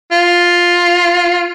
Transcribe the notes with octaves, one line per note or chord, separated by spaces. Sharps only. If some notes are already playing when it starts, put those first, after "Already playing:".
F4